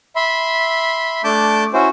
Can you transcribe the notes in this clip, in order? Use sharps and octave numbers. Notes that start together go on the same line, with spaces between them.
E5 B5 C6
A3 D4 A5 D6 G6
C#4 E4 F#4 C5